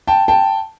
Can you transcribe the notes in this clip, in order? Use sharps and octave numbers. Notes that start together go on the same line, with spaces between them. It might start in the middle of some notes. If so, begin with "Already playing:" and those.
G5 A5
G5 A5